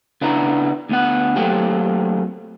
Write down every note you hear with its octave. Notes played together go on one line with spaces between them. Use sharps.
C#3 B3 D4 E4 A#5
D2 B3 F#5
F#3 A3 A#3 C4 G4